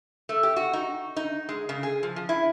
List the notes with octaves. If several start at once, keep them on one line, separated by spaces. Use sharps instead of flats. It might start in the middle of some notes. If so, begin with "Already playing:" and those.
A3
G4
F#4
D#4
D#4
G#3
C#3
G#4
F3
F3
E4